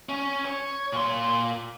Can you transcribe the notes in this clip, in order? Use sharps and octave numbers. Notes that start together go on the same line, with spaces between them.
C#4
C#5
A#2 C6